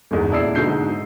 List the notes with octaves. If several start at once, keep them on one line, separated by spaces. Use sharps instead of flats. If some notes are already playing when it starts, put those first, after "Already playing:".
G1 E2 G#2
D#1 E4 D5 E6 C7
G#2 B2 D3 G6 C7
G#2